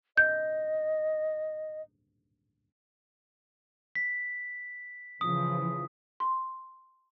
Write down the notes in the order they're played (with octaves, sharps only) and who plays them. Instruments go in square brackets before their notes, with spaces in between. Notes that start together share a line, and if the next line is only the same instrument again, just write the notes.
[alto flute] D#5 [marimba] G6
[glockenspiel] B6
[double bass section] C#3 E3 F3 [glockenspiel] D#6
[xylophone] C6